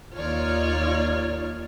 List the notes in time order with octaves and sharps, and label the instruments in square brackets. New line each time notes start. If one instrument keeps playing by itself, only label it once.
[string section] D#2 D#4 F4 C#5 D5 F6